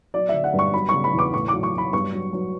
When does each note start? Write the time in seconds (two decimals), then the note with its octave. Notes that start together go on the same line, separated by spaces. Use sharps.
0.14 F#3 D5
0.29 D3 E5
0.44 F#5
0.53 G2
0.59 C#6
0.74 F#3 B5
0.89 C#3 C#6
1.04 B5
1.13 E2
1.19 D6
1.34 A2 C#6
1.48 F#3 D6
1.63 C#6
1.73 F#3 B5
1.93 G2 C#6
2.13 F#3
2.33 F#3